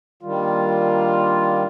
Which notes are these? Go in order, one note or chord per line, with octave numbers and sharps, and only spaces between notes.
D#3 G3 A#3 D4 F4